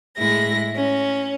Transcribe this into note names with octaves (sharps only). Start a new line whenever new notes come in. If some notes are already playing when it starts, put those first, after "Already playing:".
A2 G#3 E4 A#6
C#4